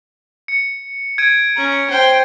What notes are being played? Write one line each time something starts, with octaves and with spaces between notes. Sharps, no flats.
C#7
G#6 D7 D#7
C#4 A#5
C5 G5